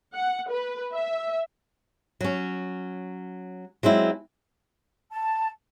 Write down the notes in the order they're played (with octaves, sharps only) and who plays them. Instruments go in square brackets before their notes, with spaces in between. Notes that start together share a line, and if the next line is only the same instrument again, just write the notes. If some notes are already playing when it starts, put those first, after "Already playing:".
[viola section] F#5
B4
E5
[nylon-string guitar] F#3 C#4
F#3 G#3 C4 E4
[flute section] A5